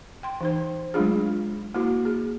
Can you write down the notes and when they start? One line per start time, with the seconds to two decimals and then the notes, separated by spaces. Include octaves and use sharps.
0.23 G5 C6
0.41 E3 D#4 C5
0.94 F#3 G#3 A3 D4 F4 G#4
1.74 A#3 E4 F#4
2.05 G#4